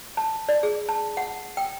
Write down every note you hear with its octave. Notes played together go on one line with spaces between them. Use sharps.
A5
D5
G#4
A5
F#5
G5